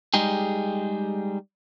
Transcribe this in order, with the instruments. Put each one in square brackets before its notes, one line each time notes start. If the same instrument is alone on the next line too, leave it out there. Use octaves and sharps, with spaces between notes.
[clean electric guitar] G3 G#3 D#4 G4 G#4